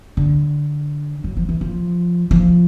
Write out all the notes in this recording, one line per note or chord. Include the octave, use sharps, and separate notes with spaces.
D3
F#3
F3
E3
F3
F3